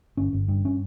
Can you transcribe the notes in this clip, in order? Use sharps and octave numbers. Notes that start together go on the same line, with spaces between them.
G1 C#4
G1
G2
C#4